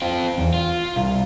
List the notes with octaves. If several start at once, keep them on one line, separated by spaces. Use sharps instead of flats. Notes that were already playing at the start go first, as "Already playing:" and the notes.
C4 F4
E2
F4
C2